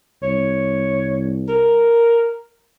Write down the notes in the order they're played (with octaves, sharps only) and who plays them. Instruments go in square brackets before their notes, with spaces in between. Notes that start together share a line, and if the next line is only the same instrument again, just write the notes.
[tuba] C2 [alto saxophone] C#5
[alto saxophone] A#4